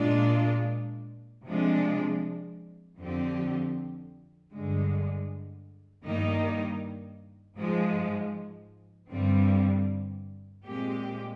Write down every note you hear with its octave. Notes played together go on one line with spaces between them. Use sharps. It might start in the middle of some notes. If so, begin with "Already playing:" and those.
Already playing: A#2 G#3 D4 F4
C3 F3 G#3 D4
F2 D3 F3 C4 G4
G2 D3 G#3
G2 D#3 G3 A#3 D#4
G#2 F3 G#3
G2 D3 G3 C4
A#2 G#3 C4 G4